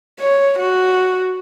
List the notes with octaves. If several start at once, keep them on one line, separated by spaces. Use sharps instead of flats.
C#5
F#4